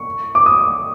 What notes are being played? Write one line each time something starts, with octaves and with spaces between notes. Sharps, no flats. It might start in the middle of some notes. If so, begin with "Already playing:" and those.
Already playing: C#6
D6
D#6